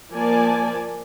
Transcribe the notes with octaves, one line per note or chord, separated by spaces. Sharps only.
F3 A#3 D5 G#5 A5